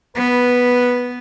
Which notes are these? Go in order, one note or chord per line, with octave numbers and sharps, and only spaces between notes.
B3 B4